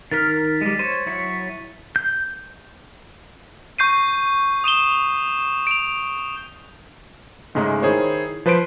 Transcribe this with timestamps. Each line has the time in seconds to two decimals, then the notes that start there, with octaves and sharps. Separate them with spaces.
0.12 D#3 A#4 F6 A6 B6
0.61 G3 G#3
0.79 C5 C#5 D#7
1.06 F#3 E4 C#5
1.96 G6
3.79 C#6 G6 C7 D#7
4.64 D#6 D#7 E7 G7
5.67 D7 F7
7.55 G#2 C#3 G#3 A3 D#4
7.82 D#3 E4 G#4 C5 C#5
8.46 F3 B4 C5 C6 D7